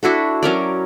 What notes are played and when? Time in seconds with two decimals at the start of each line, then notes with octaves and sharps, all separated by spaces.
0.03 D4 E4 F#4 A4
0.43 F#3 C#4 A#4 D5